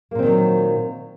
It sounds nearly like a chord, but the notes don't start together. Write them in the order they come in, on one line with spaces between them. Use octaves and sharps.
A#3 A#2 C4 D#3 F#3